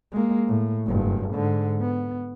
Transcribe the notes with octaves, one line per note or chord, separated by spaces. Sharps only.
G#3 A#3
A2
F#1 G2
G#2 D3
B3